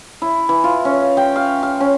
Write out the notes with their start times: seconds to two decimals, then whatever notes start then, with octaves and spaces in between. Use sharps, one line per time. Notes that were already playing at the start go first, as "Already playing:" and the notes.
0.22 E4
0.49 E3
0.64 F4
0.85 C#4
1.02 F5
1.17 G5
1.36 F5
1.63 F5
1.80 C#4